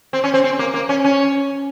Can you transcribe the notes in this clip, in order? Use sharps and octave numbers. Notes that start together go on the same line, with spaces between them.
C4
C#4
C4
C4
A#3
A#3
C#4
C#4